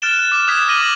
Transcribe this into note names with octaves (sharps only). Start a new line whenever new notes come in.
F6 F#6 A6 D7 E7 G7
F#6
D6
D#6 F#6 G#6 B6 E7
F6 A#6 D#7 F#7
D6 A#6 F#7